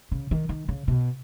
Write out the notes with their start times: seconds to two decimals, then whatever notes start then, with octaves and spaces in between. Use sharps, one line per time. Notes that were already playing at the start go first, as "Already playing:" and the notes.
0.11 C#3
0.31 D#3
0.49 D#3
0.68 C#3
0.88 B2